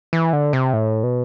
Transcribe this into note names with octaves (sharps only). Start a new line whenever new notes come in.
E3
D3
C3
A2
B2